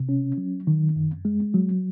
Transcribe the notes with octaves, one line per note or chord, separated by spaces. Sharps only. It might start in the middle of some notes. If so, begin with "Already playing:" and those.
Already playing: C3
C#4
F#3
D#3
F#2
G#3
F#3